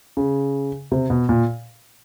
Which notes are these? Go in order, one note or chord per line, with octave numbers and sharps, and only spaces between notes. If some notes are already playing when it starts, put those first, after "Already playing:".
C#3
C3
B2
A#2